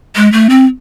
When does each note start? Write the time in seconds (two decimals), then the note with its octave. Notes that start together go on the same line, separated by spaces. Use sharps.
0.16 G#3
0.33 A3
0.50 C4